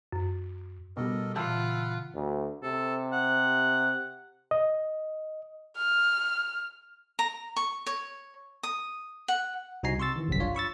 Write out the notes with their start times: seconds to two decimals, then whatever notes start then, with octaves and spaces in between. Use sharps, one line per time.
0.12 F#2
0.97 B2 G3 A4 A#4 D#5
1.36 A#2 C#3 E3 F4 F#5 A5 B5 E6
2.14 D2
2.63 C3 A4
3.13 F#5
4.51 D#5
5.77 F6
7.19 A#5
7.56 C#6
7.86 C#5
8.63 D#6
9.28 F#5
9.83 C2 D#4 F#4 G#5 A#5 C7
9.99 C3 C6 C#6 E6 A6
10.16 D#3 E3
10.28 G1 C2 F#2 B6
10.40 D4 F4 C#5
10.55 B5 C#6 E6 A6